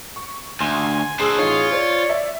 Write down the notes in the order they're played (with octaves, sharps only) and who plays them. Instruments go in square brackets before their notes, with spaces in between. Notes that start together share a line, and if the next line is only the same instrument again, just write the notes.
[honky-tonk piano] C#6
[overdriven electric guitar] D2 [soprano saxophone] G#5 [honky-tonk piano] C6
[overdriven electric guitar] D4 C5 [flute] G#4 [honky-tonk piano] E6 C7
[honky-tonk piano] A1 D#4 [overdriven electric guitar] F4 [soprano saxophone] C#5
[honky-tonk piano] C5 [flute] D5
[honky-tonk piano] E5